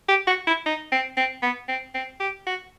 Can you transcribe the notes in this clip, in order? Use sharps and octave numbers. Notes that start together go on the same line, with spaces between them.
G4
F#4
E4
D#4
C4
C4
B3
C4
C4
G4
F#4